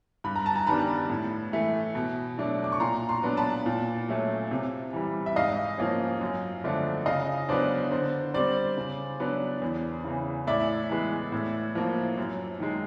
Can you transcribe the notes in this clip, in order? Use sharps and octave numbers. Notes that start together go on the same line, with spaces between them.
G2 B5
A#5
A5
G#5 A#5
D#3 G3 B3 D4 A5 B5
A2
E3 A3
B2
F#3 A3 D4
D6
C#6
A#2 A#5 C6
A#5 C6
F#3 B3 D4
A5 B5
A#2
F#3 A3 C#4
C3
E3 G3
E5
G#2 D#5 F5
F3 A#3 C#4
F#2
D3 F3 A3 D4
C#3 D#5 F5
F#3 B3 D4 C5 D5
D3 C5
G3 C4 C5 D5
C#3
F#3 B3 D4
E2
C#3 E3
A2 D5 E5
E3 G#3 B3
A2
F3 A#3
F#2
D#3 G#3